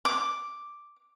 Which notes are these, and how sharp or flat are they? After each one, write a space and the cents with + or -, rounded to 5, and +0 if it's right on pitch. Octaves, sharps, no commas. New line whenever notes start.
D6 +0